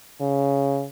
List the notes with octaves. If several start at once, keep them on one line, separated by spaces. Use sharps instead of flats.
C#3